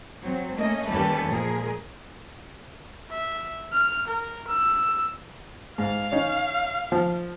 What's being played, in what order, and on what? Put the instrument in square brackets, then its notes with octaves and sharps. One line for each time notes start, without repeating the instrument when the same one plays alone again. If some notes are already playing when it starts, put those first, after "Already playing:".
[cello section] F#3 C4
A3 A#3 C#4 D#5
D#2 G3 C#4 G4 A4 B4
A#2 F3 G#3 G#4 A#4
[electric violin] E5
F6
A#4
E6
[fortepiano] G#2 [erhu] F5
[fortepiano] C#4 D#4 C#5
F3